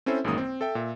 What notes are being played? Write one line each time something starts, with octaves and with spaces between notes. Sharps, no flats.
C4 C#4 E4 A4 C5 E5
A1 F#2 D#3 G#3 A#3 D#6
C4
A4 E5 G5
A#2 E5